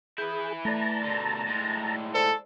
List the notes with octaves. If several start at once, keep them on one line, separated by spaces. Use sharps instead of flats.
E4 G#4 B4 G6
A3 D5 A5 A#5
B2 D3
A2 G#3
A4 C5 D5